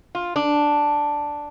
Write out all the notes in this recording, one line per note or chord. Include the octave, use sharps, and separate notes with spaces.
F4
D4